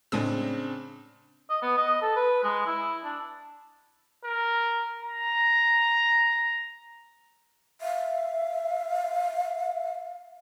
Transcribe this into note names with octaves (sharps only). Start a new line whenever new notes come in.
A2 C#3 G#3 C4 D4 D#6
D#5
B3
D#5
A4
B4
G#3
E4
D4
A#4
A#5
E5 F5